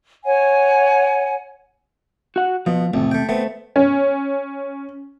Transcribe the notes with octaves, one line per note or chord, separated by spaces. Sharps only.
C#5 F#5 G#5
F#4 F#5
B2 F3
A1 F2 C3
A3 G5
A3 B3 C4
C#4